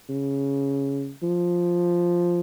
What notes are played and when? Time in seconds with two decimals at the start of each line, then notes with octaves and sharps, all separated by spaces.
0.09 C#3
1.23 F3